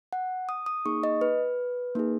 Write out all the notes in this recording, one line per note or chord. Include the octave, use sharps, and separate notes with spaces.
F#5
D#6
D#6
A#3 D#4 G#4 C#6
D#5
B4
A#3 D#4 G#4